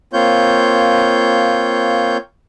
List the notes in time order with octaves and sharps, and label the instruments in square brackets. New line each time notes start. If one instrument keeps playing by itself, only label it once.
[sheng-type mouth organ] A#3 C4 F4 C#5 G6